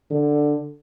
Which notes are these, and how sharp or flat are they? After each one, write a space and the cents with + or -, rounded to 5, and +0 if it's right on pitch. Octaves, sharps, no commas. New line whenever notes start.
D3 +5